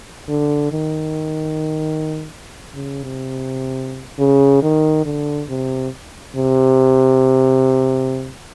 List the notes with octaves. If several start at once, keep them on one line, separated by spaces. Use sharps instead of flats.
D3
D#3
C#3
C3
C#3
D#3
D3
C3
C3